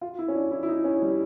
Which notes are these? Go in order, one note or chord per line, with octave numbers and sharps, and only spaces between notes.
F4
E4
C#4
D4
E4
E4
D#4
C#4
G3